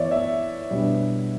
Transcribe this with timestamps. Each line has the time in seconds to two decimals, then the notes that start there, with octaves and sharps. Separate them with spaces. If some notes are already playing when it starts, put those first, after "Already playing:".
Already playing: E3 B3 E4 C#5 D5 E5
0.11 E5
0.70 B2 G3 B3 D4